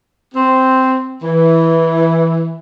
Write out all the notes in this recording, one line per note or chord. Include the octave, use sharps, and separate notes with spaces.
C4
E3